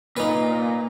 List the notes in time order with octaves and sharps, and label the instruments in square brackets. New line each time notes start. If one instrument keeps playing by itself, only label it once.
[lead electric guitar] A#2 [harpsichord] D#4 B4